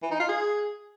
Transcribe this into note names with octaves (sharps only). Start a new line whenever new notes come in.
E3
D#4
F4
G#4